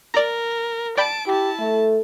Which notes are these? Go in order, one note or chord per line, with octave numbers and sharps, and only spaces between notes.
A#4 D5 A#5
D5 G5 A5 B5 D7
E4 G4 A5
A3 A4